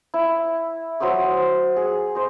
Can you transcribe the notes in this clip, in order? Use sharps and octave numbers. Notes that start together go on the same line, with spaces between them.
E4
F#3 C5 D#6 E6
G#4
C5 D#5